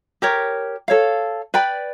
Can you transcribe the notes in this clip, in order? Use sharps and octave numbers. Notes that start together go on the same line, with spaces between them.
G4 A#4 C#5
A4 C#5 F5
B4 D5 G5 B5